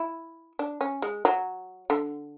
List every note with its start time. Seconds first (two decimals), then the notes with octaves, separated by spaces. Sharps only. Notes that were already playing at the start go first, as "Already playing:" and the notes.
Already playing: E4
0.59 D4
0.81 C#4
1.02 G#3
1.25 F#3
1.90 D3